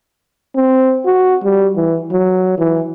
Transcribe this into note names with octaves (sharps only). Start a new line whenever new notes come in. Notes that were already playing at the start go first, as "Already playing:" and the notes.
C4
F#4
G3
E3
F#3
E3